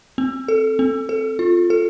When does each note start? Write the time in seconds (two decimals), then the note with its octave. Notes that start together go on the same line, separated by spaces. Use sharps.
0.18 C4
0.48 A4
0.79 C4
1.09 A4
1.39 F4
1.70 A4